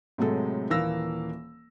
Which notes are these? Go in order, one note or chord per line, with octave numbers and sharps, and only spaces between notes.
A2 C3 F#3 G#3 A4
D#1 E3 A#3 F5 E6 A#6